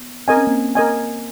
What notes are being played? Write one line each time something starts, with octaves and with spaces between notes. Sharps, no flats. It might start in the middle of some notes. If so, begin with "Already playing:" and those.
Already playing: B3
C4 A#4 D#5 G#5
C#4
A#3 C4
A#4 D#5 G#5